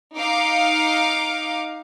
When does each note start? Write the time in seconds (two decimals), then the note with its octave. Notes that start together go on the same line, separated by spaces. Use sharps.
0.17 D#4 F5 D6